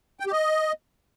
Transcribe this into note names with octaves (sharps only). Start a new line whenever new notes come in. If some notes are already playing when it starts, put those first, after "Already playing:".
G5
G4
D#5